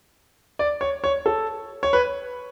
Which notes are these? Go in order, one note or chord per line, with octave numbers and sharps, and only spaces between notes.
D5
C#5
C#5
A4
C#5
B4